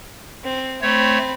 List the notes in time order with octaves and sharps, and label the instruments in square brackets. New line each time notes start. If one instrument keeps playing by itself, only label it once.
[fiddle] C4
[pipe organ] A3 C#5 [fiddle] C4 B5